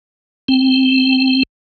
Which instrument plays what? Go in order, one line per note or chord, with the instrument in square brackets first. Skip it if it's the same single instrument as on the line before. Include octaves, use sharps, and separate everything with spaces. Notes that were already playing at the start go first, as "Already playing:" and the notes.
[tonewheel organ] C4